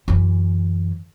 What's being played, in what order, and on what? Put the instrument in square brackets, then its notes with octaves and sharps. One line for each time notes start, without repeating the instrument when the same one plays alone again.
[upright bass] F#2 E3